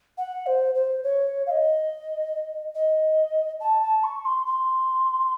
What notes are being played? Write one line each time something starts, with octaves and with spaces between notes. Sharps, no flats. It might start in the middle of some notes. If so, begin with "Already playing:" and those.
F#5
C5
C5
C#5
F5
D#5
D#5
A5
A5
C#6
C6
C6